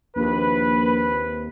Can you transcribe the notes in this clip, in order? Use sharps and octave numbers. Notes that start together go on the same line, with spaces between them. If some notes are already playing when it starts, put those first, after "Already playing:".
A#1 D#2 C4 B4